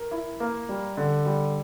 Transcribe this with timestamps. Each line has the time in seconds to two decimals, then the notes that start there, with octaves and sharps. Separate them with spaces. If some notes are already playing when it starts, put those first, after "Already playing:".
Already playing: A#4
0.11 E4
0.40 A#3
0.69 G3
0.97 D3
1.26 G3